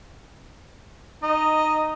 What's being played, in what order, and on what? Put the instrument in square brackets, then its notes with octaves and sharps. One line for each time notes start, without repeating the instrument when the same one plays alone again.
[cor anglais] D#4 [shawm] D#5